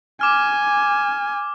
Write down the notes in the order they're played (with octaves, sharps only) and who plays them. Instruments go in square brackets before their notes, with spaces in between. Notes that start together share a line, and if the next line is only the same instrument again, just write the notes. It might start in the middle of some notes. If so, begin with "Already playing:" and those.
[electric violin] G#5 [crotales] D6 F6